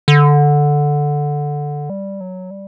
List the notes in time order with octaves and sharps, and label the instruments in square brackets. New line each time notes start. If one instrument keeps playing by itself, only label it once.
[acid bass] D3
G3
F#3
G3